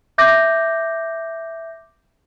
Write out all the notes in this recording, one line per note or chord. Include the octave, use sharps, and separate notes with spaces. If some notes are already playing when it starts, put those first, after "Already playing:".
E5 D6 G6 A#6